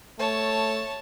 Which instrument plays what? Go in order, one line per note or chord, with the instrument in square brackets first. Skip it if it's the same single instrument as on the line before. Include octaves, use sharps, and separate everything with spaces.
[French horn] A3 [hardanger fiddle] C#5 A5